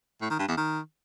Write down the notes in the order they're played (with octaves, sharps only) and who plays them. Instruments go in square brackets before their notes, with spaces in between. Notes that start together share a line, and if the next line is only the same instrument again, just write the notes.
[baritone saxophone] A2
D#3
G2
E2
D#3